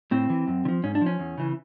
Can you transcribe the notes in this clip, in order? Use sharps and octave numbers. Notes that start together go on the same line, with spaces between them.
A2 C4
E3
F#2
D3
F3
G#2 C#4
D4
F3
C#4
E2
C#3 E3